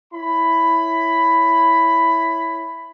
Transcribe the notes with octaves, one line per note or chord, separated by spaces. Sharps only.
E4 C#5 B5